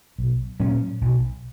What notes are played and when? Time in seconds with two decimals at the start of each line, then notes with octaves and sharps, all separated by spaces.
0.19 B1
0.60 A#2 F#3 C#4
1.01 B1